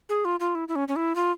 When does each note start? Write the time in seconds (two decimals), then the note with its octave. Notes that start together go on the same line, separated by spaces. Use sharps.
0.09 G#4
0.25 F4
0.40 F4
0.55 E4
0.68 E4
0.76 C#4
0.88 C#4
0.96 E4
1.16 F4